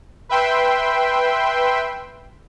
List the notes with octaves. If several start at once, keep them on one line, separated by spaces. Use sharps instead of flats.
B4 E5 G5 C6